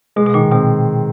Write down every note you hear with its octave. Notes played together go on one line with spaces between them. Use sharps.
B2 G#3
B2
A#2 D#3
B2 C4